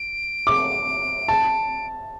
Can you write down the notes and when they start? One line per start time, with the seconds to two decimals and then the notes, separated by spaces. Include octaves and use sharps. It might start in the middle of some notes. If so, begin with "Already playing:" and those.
Already playing: D7
0.47 D6
1.28 A5